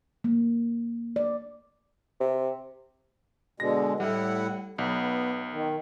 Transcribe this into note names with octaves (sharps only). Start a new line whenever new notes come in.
A#3
D5
C3
B2 D3 G#3 A#6
A2 G3 E4 F#5
B1 B3
D#3